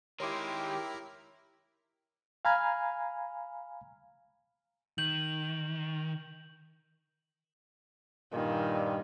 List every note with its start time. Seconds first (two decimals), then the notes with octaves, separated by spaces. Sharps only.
0.20 D#3 G#3 E4 G4 A#4 C#5 C6 D6
2.45 F5 G#5 A#5 B5 F6 G#6
4.98 D#3 G6 F#7
8.33 G2 A#2 D#3